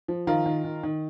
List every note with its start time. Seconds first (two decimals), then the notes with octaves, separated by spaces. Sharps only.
0.08 F3
0.27 D#3 F4 A#4
0.46 D#3
0.64 D#3
0.83 D#3